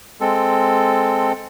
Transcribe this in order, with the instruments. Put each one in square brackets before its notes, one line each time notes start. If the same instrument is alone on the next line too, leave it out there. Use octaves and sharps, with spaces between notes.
[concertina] G#3 C4 A4